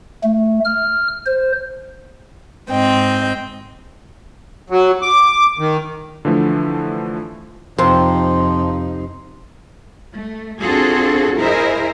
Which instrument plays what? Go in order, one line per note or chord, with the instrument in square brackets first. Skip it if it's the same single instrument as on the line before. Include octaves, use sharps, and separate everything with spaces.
[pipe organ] A3
F6
C5
[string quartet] G#2 C4 D#5 G5
[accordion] F#3
D6
D#3
[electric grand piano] D3 E3 F3 A3
[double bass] F2 D#4 [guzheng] C3 [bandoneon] F3 [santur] C5 A#5
[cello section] A3
C4 D4 F4 F#4 G#4 A4
E4 G#4 A#4 C5 D#5 E5